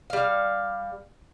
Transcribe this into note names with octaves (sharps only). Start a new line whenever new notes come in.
G3 F5